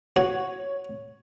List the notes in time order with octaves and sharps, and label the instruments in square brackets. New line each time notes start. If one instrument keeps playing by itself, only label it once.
[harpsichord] F#4 [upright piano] C#5